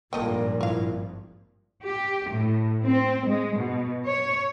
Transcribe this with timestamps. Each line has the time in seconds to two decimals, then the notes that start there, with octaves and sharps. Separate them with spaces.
0.13 G#1 G2 A#2 F3 A3 A#3 D#5 G5
0.61 E4 A#4 F5
1.85 G4
2.31 A2
2.85 C4
3.27 G#3
3.57 B2
4.06 C#5